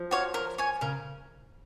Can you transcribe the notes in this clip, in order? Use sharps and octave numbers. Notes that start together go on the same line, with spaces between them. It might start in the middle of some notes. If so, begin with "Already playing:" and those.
Already playing: F3
F#4 C#5 F5
A#4
C#5 G#5
C#3 A#4